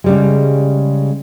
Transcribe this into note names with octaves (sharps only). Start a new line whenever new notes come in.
C#3 G3 G#3